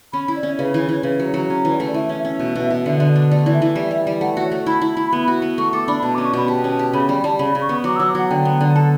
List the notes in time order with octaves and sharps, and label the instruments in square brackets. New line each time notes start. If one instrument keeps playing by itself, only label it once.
[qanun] C#4 [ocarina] B5
[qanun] E4
[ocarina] D5
[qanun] C#4
[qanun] C#3 [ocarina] B4
[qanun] E3
[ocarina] C#5
[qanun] E3
[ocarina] C#5
[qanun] C#3 [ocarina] B4
[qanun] F#3
[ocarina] C#5
[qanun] F#3
[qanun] C#4 [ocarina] C#5
[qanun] E3 [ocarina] C#5
[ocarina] D5
[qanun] A3
[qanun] E3 [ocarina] E5
[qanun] C#4
[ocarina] E5
[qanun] C#4
B2
B2
B2
D3
D3
D4
[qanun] A3 [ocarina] D5
[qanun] E3
[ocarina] E5
[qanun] E3
G3
G3
G3
[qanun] A3 [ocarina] F#5
[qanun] F#4
[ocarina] C#5
[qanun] A3
[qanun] E4 [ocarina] B5
[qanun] E4
E4
B3
F#4
B3
[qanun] A3 [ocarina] C#6
[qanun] A4 [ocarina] D6
[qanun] D4 [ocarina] B5
[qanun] B2 [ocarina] A5
[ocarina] D6
[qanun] C#4
[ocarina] C#6
[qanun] B2 [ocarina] B5
[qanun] G4 [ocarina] A5
[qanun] C#4
[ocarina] A5
[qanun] G4
[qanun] C#3 [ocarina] B5
[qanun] G3 [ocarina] B5
[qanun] G3 [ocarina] A5
[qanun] C#3 [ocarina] B5
[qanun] C#3
[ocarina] C#6
[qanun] B3
[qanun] F#3 [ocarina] D6
[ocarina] E6
[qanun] F#3
[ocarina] D6
[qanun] F#3 [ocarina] F#5
[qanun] D3 [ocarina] G5
[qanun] B3
D3
[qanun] A4 [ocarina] A5